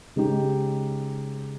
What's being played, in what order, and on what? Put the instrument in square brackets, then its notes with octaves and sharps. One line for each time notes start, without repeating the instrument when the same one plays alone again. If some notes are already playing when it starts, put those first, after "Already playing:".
[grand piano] C#3 G#3 D#4 G4